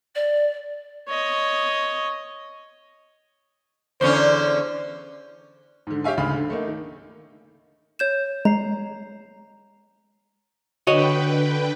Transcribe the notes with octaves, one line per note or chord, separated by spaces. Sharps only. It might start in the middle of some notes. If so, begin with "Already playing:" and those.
D5
C#5 D#5
E2 D3 C#4 C5
G#2 D3
G4 C#5 E5 F5 G#5
D2 G#2 C#3 F5 B5
D3
A3 A#3 D#4
D#3
C#5 G6 E7
G#3 A#5 C7
D3 F#4 B4 C#5 D#5 G5